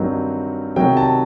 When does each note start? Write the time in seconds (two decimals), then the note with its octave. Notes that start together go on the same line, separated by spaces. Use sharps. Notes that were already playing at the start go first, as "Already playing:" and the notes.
Already playing: G2 D#3 F#3 C4 D#4
0.76 C3 D#3 F#3 G5
0.97 A5